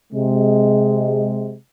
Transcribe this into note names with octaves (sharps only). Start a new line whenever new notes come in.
C3 G#3